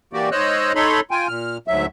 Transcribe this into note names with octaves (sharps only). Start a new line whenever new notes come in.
E3 A#3 F#4 G4 D5
G#2 C5 C#5 D#5 E6 F#6
D#4 A4 C#5 B5 C6
F4 G5 G#5
A#2 F6
D2 G#2 F#3 E5